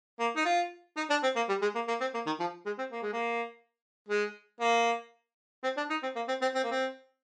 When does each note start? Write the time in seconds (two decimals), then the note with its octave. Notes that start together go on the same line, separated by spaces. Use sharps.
0.19 A#3
0.36 D#4
0.45 F4
0.97 D#4
1.10 D4
1.23 C4
1.36 A#3
1.49 G3
1.62 G#3
1.75 A#3
1.88 A#3
2.01 C4
2.14 A#3
2.26 D#3
2.40 F3
2.66 G#3
2.79 C4
2.92 A#3
3.02 G#3
3.13 A#3
4.09 G#3
4.60 A#3
5.64 C4
5.77 D4
5.90 D#4
6.03 C4
6.16 A#3
6.28 C4
6.42 C4
6.55 C4
6.63 A#3
6.71 C4